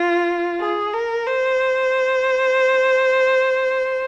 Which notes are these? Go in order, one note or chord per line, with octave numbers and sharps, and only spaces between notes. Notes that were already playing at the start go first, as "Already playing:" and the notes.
Already playing: F4
G#4
A#4
C5